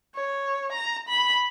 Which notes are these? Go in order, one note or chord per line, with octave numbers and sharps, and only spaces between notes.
C#5
A#5
B5